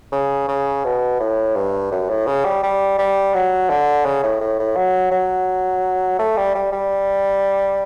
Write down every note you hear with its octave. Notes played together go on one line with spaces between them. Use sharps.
C#3
C#3
B2
A2
G2
F#2
A2
C#3
G3
G3
G3
F#3
D3
C#3
A2
A2
A2
F#3
F#3
A3
G3
G3
G3